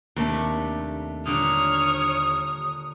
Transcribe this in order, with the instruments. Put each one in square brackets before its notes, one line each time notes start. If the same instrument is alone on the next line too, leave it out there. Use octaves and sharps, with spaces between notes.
[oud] D#2 [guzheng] C3 A3 D4
[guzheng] A#2 D3 G3 [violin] C#5 F6 [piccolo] D#6